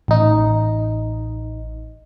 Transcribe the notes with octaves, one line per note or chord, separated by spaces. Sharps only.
A1 D#4